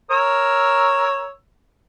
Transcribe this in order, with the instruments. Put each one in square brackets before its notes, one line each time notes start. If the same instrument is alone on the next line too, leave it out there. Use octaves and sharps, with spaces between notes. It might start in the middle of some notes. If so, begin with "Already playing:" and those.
[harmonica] A#4 C#5 E6